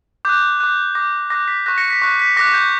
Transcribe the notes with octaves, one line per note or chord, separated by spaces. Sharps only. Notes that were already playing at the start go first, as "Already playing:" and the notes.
D6 F#6 G6
D6 F#6
D6 F#6 A#6
D6 F#6 A#6
B6
C#6 F#6 A#6
A#6 C#7
B6
C#6 F#6
B6
D6 F#6 A#6
G6